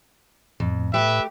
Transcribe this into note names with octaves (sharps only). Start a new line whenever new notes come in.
F2 A2
A3 G4 B4 E5